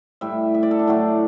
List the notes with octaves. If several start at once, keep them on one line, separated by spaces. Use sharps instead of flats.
A2 G3 E5
E5
D5
A4
D4
A2 F#3 A3